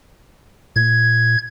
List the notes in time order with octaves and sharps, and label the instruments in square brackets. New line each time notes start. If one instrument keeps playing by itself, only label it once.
[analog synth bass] A#2 [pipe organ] G#6